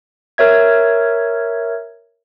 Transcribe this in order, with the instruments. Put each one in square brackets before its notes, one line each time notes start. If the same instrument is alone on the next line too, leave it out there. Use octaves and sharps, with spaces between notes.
[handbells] A#4 C#5 E5 G#6